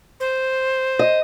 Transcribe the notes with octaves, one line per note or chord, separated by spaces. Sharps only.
C5
D#5